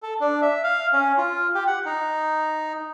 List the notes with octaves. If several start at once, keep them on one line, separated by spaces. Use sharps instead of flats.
A4
D4
E5
F5
C#4
F4
G4
F#5
D#4